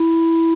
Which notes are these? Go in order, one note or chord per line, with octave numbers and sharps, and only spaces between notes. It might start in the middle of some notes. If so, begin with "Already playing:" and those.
Already playing: E4